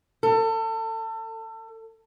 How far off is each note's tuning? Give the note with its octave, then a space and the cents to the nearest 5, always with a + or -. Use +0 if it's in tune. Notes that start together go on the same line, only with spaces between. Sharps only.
A4 +30